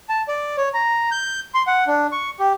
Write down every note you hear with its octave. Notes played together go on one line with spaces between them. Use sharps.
A5
D5
C#5
A#5
G6
C6
F#5
D4
C#6
G4